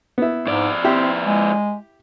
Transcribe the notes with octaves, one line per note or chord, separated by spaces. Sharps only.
B3 E4
F2 G#2 D5
C4 E4 G4
G#3